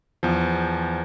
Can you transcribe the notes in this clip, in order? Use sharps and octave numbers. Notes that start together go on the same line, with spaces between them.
E2 F3